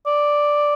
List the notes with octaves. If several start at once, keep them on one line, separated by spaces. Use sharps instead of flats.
D5